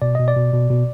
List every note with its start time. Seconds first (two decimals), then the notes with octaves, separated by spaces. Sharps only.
0.02 B2 D5
0.15 B2 D#5
0.28 D5
0.36 B2
0.53 B2
0.70 B2